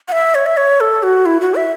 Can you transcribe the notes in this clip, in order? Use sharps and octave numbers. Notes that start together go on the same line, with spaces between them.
F#5
E5
C#5
E5
C#5
A4
F#4
E4
F#4
E5